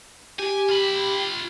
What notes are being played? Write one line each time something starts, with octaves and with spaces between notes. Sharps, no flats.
G4 G#5
F4 B5